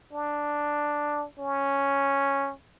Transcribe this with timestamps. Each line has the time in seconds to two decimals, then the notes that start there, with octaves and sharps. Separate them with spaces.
0.13 D4
1.39 C#4